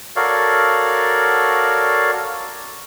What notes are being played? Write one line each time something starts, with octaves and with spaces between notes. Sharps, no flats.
F#4 A4 A#4 C#5 D5 F5